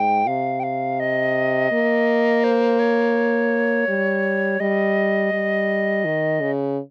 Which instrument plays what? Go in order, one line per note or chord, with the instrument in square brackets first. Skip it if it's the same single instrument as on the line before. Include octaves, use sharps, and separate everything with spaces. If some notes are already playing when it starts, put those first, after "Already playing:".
Already playing: [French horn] G#2 [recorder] G5
[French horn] C3 [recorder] F5
[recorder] G5
F5
D#5
[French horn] A#3
[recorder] C5
C#5
[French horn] G3
[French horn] G3 [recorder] D#5
[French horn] G3
D#3
C#3